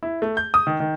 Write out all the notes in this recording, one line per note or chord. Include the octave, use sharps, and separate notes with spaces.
E4
A3
G6
D#6
D#3
D#3